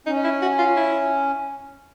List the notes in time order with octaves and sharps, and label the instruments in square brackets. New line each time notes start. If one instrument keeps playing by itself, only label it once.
[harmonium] C#4 [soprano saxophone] D#4
[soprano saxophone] E4
F#4
F4
E4